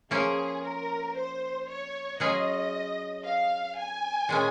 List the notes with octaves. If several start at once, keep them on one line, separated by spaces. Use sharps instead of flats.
F3 A#3 C#4 G#4
A#4
C5
C#5
F#3 C#4 F4 G#4 D#5
F5
G#5
A#2 G#3 C#4